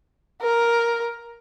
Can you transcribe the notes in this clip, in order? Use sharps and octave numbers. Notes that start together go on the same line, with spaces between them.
A#4